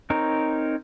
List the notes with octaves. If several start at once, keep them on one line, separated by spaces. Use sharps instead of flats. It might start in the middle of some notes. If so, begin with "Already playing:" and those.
C4 D#4 A#4 C#5